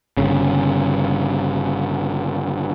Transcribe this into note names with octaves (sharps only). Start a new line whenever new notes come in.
G1 C#3